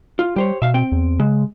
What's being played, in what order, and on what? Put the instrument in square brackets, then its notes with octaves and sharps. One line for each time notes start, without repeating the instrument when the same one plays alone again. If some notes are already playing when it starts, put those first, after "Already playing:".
[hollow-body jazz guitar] F4
[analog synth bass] G3 [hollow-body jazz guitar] G4 C5 C#5
[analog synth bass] B2 [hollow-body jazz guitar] E5 F5
[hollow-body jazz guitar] C4 G5
[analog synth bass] E2
[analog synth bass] C#3 [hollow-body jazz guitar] G#3